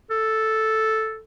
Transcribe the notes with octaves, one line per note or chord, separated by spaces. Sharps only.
A4